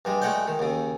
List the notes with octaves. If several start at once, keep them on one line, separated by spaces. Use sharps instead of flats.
G2 G3 G#3
G#3 A3 F#4 C#5 D5 G5
D#3
D#2 C#3